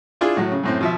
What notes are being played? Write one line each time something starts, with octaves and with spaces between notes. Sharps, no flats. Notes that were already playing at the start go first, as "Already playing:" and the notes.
D4 E4 F4 G#4
A2 F#3
C#3
F#2 A2 C4
B2 F3 E5